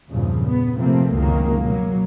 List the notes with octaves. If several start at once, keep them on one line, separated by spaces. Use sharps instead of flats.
E2 G2 A#2 C#3 F3
B3
C3 F3 A3 A#3 C4
C#2 F#2 D#3 F#3 A#3
B2 F#3 A#3